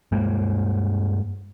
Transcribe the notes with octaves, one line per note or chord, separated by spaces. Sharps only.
G2 G#3 A#3